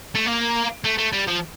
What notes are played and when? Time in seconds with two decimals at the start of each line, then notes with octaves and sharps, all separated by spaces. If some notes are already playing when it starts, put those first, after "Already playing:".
0.15 A3
0.26 A#3
0.84 A3
0.98 A3
1.13 G3
1.28 F3